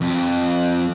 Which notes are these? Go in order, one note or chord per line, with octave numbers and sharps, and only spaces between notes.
F2